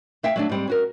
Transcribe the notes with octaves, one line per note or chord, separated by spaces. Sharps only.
A3 E5 F5 G5
F#3 A3 D4
G#2 G3 C4
C#4 F#4 A#4